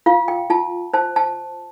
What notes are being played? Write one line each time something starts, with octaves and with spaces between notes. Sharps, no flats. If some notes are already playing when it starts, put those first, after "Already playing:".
F4 F5
G5
F4 A5
C5 A5
A5